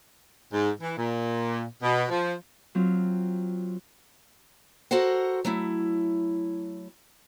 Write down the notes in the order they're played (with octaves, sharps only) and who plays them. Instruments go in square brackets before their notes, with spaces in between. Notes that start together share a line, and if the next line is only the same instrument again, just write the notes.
[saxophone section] G#2
E3
A#2
B2
F3
[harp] F#3 C4 F4
[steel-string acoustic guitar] F#4 A4 A#4 C5 F#5
F#3 A3 E4